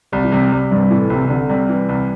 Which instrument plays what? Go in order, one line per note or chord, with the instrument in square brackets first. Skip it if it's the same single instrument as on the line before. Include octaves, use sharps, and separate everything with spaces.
[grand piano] C2 [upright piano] G3
[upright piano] E3
[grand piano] C3 [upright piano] G3
[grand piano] C3 [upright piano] G3
[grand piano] C2 [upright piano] G2
[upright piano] A2 [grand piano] E3
[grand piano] C2 [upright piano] C3
[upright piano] C3
[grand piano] C2 [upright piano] D3
[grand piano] C3 [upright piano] G3
[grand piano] E3
C2